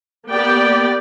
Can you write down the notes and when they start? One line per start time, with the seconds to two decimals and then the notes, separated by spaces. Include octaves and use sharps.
0.29 A#3 B3 G4 D5 G5